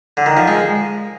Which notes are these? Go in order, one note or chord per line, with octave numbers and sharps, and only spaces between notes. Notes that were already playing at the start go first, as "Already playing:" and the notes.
D3
D#3
F3
G#3